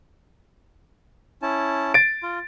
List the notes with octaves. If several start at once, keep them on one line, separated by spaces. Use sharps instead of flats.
C#4 E4 A5
A6 D7
F4